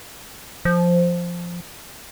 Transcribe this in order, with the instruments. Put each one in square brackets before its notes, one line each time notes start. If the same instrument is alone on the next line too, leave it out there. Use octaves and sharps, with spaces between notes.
[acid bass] F3